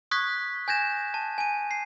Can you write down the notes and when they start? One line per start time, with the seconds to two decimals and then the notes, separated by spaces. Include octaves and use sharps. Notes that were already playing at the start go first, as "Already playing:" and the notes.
0.11 C#6 D#6 F#6 G#6 B6
0.68 G#5 G6 G#6 A#6 E7
1.14 A5
1.38 G#5 D#7
1.71 C7